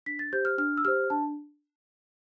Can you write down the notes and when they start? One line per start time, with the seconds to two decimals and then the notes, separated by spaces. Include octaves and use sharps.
0.06 D4 B6
0.19 A6
0.33 G4 C5 G6
0.45 F6
0.58 D4 F6
0.77 E6
0.85 G4 C5 F6
1.10 D4 A5